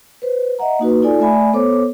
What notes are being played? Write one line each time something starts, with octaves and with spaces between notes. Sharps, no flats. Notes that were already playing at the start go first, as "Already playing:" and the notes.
B4 C5
D#5 E5 F#5 A#5
A#3 D#4 F#4 B4
D#4 F4 A4 D5 G#5
A3 D5 E5 G#5 B5
B3 A4 C5 C#5 D6